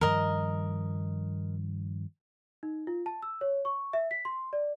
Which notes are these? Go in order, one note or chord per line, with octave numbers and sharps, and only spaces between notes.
G2 D#3 F3 A#4 D#5
D#4
F4
A5
E6
C#5
C#6
E5
B6
C6
D5